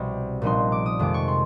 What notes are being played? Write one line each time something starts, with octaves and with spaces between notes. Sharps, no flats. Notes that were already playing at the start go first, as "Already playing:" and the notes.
Already playing: C2 B2 G3
A#1 A#2 G3 B3 D#4 C6
D6
D#6
F2 C3 D#3 G#3 D6
C#6
C6